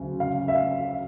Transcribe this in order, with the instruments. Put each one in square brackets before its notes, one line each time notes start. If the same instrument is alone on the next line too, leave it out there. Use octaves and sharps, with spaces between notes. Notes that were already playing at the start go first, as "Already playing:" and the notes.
Already playing: [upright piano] D2 C#3 F#3
[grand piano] F5
E5
F5